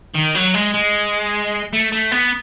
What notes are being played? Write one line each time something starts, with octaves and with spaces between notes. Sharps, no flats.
D#3
F#3
G#3
G#3
A3
A3
B3